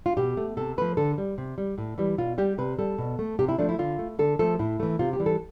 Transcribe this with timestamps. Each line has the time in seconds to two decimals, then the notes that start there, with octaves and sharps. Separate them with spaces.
0.06 F4
0.17 B2 G4
0.37 A3
0.57 C3 A4
0.78 F3 A3 B4
0.97 D3 A4
1.18 G3
1.38 C3
1.58 G3
1.78 A2
1.98 E3 G3
2.18 B2 F4
2.38 G3 G4
2.58 C3 B4
2.79 G3 A4
2.98 B2
3.19 A3
3.39 C3 G4
3.49 E4
3.58 F3 A3 D4
3.69 E4
3.79 D3 F4
3.99 A3
4.19 D3 A4
4.39 F3 A3 A4
4.59 A2 E4
4.80 E3 A3
4.99 C3 F4
5.13 G4
5.19 E3 G3
5.26 A4